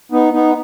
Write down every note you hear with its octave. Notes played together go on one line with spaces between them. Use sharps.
B3 D#4
B3 D#4